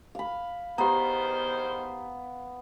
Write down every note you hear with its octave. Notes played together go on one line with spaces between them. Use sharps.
F5 B5
E2 D#3 B3 G4 C5 A#5